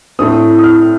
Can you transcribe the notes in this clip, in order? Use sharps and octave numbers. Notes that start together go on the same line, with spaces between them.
A2 A3 C4 D#6
D#6
F6